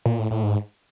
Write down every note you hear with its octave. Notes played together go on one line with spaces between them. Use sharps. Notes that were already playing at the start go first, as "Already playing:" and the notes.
A#2
A2
A2
G#2